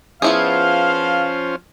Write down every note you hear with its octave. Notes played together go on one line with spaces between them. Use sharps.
F3 B3 C#4 E4 F4 G#4 C5 F5